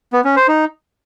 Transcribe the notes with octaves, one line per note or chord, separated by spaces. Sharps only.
B3
C#4
C5
D#4